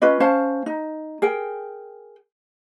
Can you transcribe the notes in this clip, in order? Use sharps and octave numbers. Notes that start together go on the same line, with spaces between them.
C#4 F4 B4 D#5
C#4 C5 F5 A5
D#4
G#4 A#4 G5